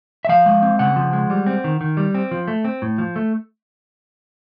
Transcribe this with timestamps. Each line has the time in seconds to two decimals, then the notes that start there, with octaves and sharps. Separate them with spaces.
0.25 E5
0.29 F3 F5
0.46 G#3
0.62 C4
0.79 C#3 F#5
0.96 F3
1.13 G#3
1.30 G3
1.47 C4
1.64 D#3
1.81 D#3
1.97 G3
2.15 C4
2.31 F3
2.48 A3
2.64 C4
2.82 A2
2.98 F3
3.16 A3